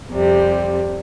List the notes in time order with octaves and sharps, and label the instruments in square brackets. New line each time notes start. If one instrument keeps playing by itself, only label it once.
[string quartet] F2 C3 G3